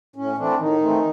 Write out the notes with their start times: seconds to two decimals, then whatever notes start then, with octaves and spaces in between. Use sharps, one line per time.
0.16 A2 C#4
0.37 E3 A3 C4 D4
0.59 A2 D#3 D#4
0.81 E3 A3 C4